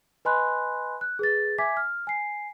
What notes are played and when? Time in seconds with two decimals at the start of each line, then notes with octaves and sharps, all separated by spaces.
0.25 B4 D#5 G#5 B5 C6 F#6
1.01 F#6
1.19 G#4 B4 A6
1.58 E5 G#5 D6 G#6 B6
1.77 F6
2.07 G#5 C7